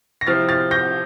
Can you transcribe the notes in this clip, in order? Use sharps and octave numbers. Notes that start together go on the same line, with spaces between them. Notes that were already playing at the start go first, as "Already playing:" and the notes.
A#6
C3 F3 C4 E4 F6 A6
F6 A6
G6 A#6